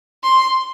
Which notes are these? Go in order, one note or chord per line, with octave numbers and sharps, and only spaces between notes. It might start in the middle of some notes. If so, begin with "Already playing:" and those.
C6